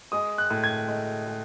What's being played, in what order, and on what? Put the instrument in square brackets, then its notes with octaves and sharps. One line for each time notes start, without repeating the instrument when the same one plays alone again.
[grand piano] G#3 D#6
F#6
A2
G#6
G#3
G#3